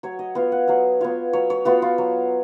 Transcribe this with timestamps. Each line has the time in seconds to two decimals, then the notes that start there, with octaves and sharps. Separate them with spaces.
0.03 F#3 C#5
0.19 D#5
0.35 B3 F4 F5
0.52 F#5
0.68 F#3 F5
1.01 B3 F4 C#5
1.33 F#3 C#5
1.50 C#5
1.65 B3 F4 F#4
1.82 F4
1.98 F#3